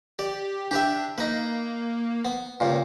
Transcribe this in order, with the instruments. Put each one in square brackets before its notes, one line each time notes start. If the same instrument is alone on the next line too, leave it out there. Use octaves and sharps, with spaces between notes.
[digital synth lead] G4 [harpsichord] D5
[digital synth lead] D4 [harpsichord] G4 B4 E5
[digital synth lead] A#3 [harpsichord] D#4 B4
[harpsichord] B3
C#2 G2 A#2